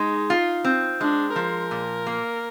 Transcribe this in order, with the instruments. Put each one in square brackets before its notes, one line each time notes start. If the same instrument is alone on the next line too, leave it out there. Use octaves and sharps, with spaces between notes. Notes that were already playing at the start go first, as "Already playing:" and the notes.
Already playing: [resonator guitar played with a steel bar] G#3 [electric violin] D#4
[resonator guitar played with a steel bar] F4
C4
[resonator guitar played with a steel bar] G#3 [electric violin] D4
[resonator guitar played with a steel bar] F3 [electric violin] A#4
[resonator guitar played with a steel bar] A#2
A#3